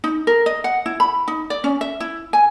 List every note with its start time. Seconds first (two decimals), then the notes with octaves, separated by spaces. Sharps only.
0.04 D#4
0.27 A#4
0.46 D#5
0.64 F#5
0.86 E4
1.00 B5
1.28 D#4
1.50 D5
1.64 C#4
1.81 E5
2.00 E4
2.33 G#5